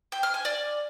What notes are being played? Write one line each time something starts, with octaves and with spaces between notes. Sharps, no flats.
G5
F6
G#5
D5